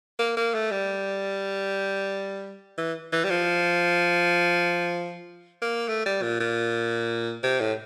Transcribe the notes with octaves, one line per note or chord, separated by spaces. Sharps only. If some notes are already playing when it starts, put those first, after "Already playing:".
A#3
A#3
A3
G3
E3
E3
G3
F3
A#3
A3
G3
A#2
A#2
C3
A2